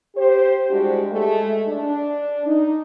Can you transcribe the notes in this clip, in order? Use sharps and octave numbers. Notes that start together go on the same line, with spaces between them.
G4 C5
G3 G#3 D4 E4 F#4 G4
G#3 A3
D4
D#4